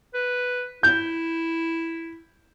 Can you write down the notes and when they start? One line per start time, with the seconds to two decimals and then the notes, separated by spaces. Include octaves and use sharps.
0.14 B4
0.83 E4 G6